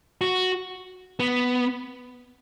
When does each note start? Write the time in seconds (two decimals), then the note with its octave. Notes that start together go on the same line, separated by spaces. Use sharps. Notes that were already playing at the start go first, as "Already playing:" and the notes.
0.21 F#4
1.20 B3